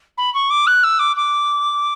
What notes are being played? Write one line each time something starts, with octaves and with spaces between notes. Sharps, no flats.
B5
C#6
D6
F#6
E6
D6
D6